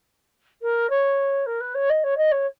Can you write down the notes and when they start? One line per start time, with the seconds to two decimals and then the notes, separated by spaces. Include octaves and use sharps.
0.62 A#4
0.90 C#5
1.46 A#4
1.60 B4
1.74 C#5
1.90 D#5
2.03 C#5
2.17 D#5
2.31 C#5